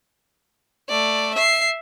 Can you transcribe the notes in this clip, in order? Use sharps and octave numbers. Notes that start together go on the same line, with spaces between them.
A3 D5
E5 C7